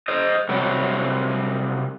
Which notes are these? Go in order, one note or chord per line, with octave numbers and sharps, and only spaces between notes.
C5 D#5
C3 F#3 G3 C#5